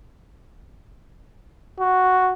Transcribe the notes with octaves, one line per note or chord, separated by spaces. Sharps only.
F#4